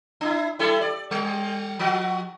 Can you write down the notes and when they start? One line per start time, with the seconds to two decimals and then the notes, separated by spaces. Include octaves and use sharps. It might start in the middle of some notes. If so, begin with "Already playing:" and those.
0.21 D4 E4
0.59 G3 E4 A4
0.81 D5
1.11 G3
1.79 F3 F#4